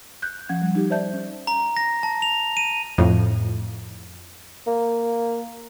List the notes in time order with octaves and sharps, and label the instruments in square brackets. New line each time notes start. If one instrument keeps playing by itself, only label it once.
[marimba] F#6 G6
F3 C#4 F#5 G#6
G3
D#4 G4
C5 D5 E5 A5 G6
C#4
[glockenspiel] A#5
A#6
A5
F7
D#7
[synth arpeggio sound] F2 A2
[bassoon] A#3